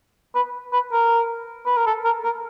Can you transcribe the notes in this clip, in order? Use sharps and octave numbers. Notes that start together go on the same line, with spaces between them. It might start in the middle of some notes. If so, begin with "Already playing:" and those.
B4
B4
A#4
B4
A#4
A4
A#4
A#4